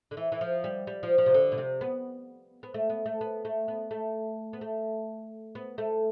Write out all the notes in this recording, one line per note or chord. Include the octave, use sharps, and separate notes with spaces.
D3
E3
E3
F3
G3
G3
F3
F3
C3
D3
B2
C3
B3
B3
A3
B3
A3
B3
A3
B3
A3
B3
A3
B3
A3